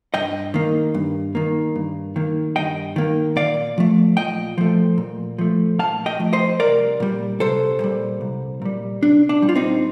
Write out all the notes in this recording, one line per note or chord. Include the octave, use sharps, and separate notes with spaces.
G2 D#5 G5
D#3 A#3
G2
D#3 A#3
G2
D#3 A#3
G2 D#5 G5
D#3 A#3
A#2 D5 F5
F3 A3
A#2 D#5 G5
F3 A3
A#2
F3 A3
A#2 F5 A5
D#5 G5
F3 A3
C5 D#5
C2 A#4 D5
A#2 G3
C2 A4 C5
A#2 G3
C2
A#2 G3
C2 D4
D4
A#2 G3
F4
C4 D#4